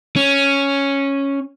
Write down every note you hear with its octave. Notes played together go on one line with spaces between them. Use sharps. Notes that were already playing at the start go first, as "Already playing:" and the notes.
C#4